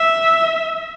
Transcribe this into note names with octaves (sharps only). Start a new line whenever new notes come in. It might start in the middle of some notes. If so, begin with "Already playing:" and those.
Already playing: E5